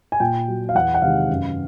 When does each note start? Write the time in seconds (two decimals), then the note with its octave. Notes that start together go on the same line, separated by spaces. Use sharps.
0.12 G#5
0.20 A#2 G5
0.48 F#3
0.69 F5
0.75 E2 F#5
0.94 F#5
1.02 C3 D#3 G#3 F5
1.30 F#2